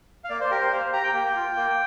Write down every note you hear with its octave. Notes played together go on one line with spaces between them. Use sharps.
F5
A#3 D5
C5
G4 A#4
C5
A#3 F5
G4 A#5
G5
A#3
F4
A#3